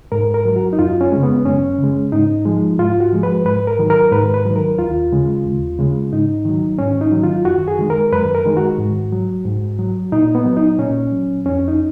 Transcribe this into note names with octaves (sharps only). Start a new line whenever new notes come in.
G#2 A#4
A#4
F#3
F#4
D#4
F#2 F4
C#4
C#3 G#3
B3
F#2 C#4
C#3 G#3
G#2 D#4
F3 G#3
G#2 F4
F#4
F3 G#3
B4
G#2 B4
A#4
D#3 F#3
A#4
G#2 B4
B4
D#3 F#3
A#4
D#2 F4
C#3 G#3
D#2
C#3 G#3
G#2 D#4
D#3 F#3
G#2 C#4
D#4
D#3 F#3
F4
F#2 F#4
G#4
D#3 G#3
A#4
F#2 B4
A#4
D#3 G#3
F#4
G#2
F#3
G#2
F#3
A#2 D#4
B3
F#3
D#4
A#2 C#4
F#3
F2 C#4
D#4